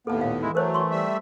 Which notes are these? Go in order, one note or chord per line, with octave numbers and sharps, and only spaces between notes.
D#2 A2 A#3 B3 A4 A5
A#2 F5
E3 G#3 E4
F#3 A3 A#4 C5 C#5
C6 C#6
G3 E5